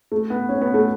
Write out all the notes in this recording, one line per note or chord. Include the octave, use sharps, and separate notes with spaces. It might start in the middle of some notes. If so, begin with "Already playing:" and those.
A3
B3
C#4
B3
A3